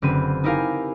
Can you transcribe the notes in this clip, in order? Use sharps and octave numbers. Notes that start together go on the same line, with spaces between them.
F#1 D3 C4 B4 D#7
D#4 E4 G4 A#4 F5 G#5